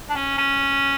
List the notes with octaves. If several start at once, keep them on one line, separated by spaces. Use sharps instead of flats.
D4
C#4
C#4